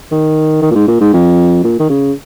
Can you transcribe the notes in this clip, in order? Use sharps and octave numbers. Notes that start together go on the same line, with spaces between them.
D#3
D#3
A#2
G#2
A#2
G#2
F2
A#2
D#3
C#3